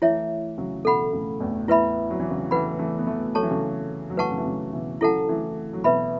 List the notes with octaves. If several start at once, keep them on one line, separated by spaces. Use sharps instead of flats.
E3 A3 E4 C#5 E5
C#3 F#3
B2 E3 A4 F#5 B5
A2 C#3
E2 A2
E2 A2 E4 B4 E5 B5
F#3
E3
C#3 F#3
E3 A3 B4 F#5 B5
E3 A3
B3
E3 A3
F#3 A4 C#5 A5 C#6
E3
C#3 F#3
F#3
E3 A3 B4 F#5 A5 C#6
C#3
E3
C#3 F#3
B2 E3
C#3 F#3 E4 A4 F#5 A5
E3 A3
F#3
B2 E3 B4 E5 B5